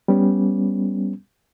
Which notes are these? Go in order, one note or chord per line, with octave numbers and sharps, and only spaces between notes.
G3 B3 C#4